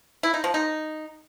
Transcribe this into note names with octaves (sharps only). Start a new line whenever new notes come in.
E4
D#4
F3
D#4